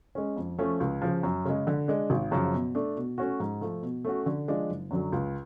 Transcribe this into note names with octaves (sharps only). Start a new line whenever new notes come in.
G#3 C#4
F2
F3 A3 C#4
C#2
C#3 F3
F#2
C#3 G#3
D3
G#3 D4
G#1
F#2 C#3 F3
B2
A3 D4
B2
A3 C#4 F#4
G#2
F3 A3
B2
A3 C#4 F#4
D3
F3 G#3 D4 F4
F#1
F#2 D3 F#3
C#2